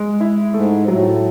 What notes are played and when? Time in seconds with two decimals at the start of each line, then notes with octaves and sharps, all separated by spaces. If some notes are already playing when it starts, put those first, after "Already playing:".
Already playing: G#3
0.20 E4
0.54 G#2 A3
0.88 A2 F#3